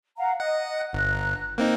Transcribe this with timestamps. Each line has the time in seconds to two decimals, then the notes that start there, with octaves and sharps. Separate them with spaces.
0.18 F5 F#5 A#5
0.40 D#5 F#5
0.93 G1 A#5 F#6
1.58 A#3 C4 D#4